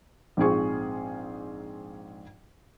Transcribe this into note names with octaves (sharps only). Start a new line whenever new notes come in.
A#1 G#2 C4 F4 G#4 C#6